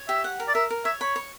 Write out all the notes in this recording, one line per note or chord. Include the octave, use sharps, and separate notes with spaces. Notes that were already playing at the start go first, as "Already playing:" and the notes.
Already playing: C#5
G4 E5
F#5
A#4
D5
A#4 E5
A#4
C#5 E5
C#5 B5
C#5